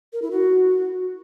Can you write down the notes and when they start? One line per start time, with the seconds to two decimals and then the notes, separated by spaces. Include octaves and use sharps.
0.12 A#4
0.22 E4
0.31 F#4